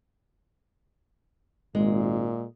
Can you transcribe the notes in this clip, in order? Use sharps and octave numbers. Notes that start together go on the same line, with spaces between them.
G#1 A#2 G#3